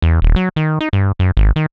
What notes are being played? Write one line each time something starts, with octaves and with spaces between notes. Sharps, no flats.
E2
D#1
F#3
D#3
D#4
G2
F#2
G#1
D#3